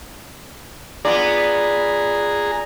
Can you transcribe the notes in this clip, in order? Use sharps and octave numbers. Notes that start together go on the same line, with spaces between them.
B3 F4 G#4 D5 A#5